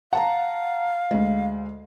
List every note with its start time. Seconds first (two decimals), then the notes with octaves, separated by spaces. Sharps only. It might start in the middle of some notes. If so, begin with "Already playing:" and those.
0.13 F5 F#5 A5 A#5
1.11 D2 G#3